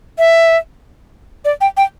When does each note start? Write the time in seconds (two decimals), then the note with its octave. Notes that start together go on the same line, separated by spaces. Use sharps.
0.19 E5
1.45 D5
1.61 G5
1.77 G5